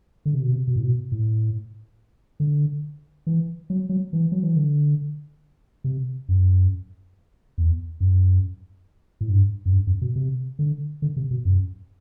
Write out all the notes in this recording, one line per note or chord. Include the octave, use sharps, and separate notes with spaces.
D3
C3
B2
C3
B2
A2
B2
A2
D3
E3
F#3
F#3
E3
F#3
E3
D3
C3
F#2
E2
F#2
A2
G2
F#2
G2
F#2
B2
C3
D3
D3
C3
B2
F#2